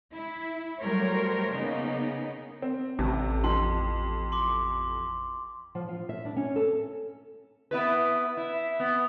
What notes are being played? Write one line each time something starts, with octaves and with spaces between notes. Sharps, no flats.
E4
F#3 G3 A3 A#4 C5 C#5
C#3 A#3 B3 D#4
C4
A1 C3 A5
F2 C6
C6 D6
F3
F4
E5
D4
C#4
A4
B3 E4 B4
E4
B3